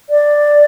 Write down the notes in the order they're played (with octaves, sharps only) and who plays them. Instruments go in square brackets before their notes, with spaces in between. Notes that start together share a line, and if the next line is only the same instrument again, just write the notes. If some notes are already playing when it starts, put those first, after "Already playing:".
[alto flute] D5